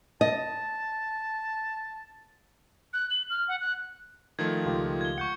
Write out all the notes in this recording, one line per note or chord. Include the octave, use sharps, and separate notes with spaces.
D#5 A5
F#6
F#7
F6
F#5
F#6
D#3 F3 A3 G#6
C#2 F4 G4
G#6 G7
F#5 C#6 G6 C#7